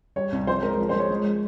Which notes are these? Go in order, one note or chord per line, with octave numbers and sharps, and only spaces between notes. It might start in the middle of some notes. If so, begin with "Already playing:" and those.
G3 C#5
C2
F3 C5
G#3 A#4
F3
C5
G#3 C#5
G#3